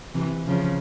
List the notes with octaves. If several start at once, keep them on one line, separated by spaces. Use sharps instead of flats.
C3 E3
C#3 F3